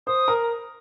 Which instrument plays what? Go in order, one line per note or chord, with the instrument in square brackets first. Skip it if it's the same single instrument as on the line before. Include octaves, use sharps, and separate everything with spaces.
[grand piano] C5 [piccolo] D#6
[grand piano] A#4